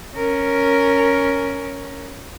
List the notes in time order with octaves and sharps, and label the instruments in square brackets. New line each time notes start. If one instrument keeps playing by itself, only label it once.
[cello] C#4 A#4